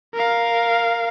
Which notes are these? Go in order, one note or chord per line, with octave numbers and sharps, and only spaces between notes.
A#4 F5